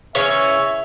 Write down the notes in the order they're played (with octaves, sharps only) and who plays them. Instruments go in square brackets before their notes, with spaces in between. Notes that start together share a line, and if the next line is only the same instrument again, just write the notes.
[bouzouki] C#3 E3 C#4 [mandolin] C#5 [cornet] E5